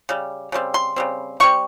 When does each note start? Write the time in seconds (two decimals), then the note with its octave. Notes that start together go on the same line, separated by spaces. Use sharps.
0.09 C#3 G3
0.52 C#3 G3 C4
0.74 C6
0.96 C#3 G3 C4
1.40 C#3 G3 C4 C#6